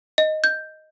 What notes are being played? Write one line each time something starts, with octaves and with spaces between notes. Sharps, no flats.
D#5
G6